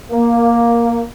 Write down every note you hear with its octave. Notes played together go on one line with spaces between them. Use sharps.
A#3